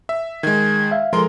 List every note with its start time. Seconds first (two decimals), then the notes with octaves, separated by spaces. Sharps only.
0.09 E5
0.43 D#3 G#3 G#6
0.91 E5 F5
1.13 F3 G#3 F4 A4 A#4 C6